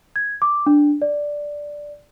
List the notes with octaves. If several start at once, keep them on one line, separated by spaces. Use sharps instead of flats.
G#6
D6
D4
D5